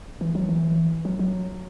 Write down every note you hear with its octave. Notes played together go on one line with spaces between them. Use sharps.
E3
F#3
E3
F#3
F#3